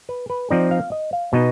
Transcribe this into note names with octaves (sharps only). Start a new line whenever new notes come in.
B4
B4
F3 C4 D#4 D5
F5
D#5
F5
B2 B3 D#4 D#5